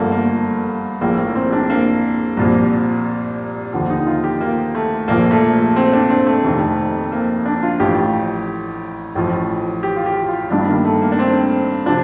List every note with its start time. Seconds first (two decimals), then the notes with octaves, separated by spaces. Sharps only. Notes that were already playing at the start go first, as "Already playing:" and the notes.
Already playing: G1 G2 D3 F3 A3 A#3
0.11 A#3
1.01 A#1 A2 F3 A#3
1.18 A#3
1.35 C4
1.52 D4
1.70 A#3
2.37 C2 A#2 F3
3.73 D#2 D3 F3
3.90 D#4
4.07 F4
4.24 G4
4.41 A#3
4.75 A3
5.08 A#1 A#2 F3 A#3
5.31 A3
5.76 C4
5.93 D4
6.10 C4
6.27 A3
6.43 F1 F2 C3 D#3
7.12 A#3
7.45 D4
7.63 F4
7.79 A1 A2 F3 G4
9.15 A1 A2 F3
9.83 G4
9.96 F4
10.06 G4
10.28 F4
10.50 G1 G2 D#3 D4
10.67 A#3
10.85 A3
11.02 A#3
11.12 D4
11.19 C4
11.86 C3 F3 D4